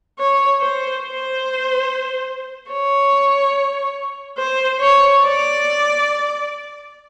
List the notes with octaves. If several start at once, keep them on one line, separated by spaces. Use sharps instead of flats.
C#5
C5
C5
C#5
C5
C#5
D5